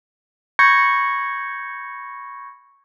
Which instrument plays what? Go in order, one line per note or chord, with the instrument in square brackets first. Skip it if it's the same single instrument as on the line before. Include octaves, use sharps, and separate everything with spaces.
[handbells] B5 C#6 G6 G#6 A#6 C#7